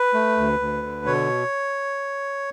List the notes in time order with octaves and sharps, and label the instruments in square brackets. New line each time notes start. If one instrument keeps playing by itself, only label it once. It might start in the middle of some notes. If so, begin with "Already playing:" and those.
Already playing: [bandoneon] B4
A3
D2
D2
D3
B2 C#5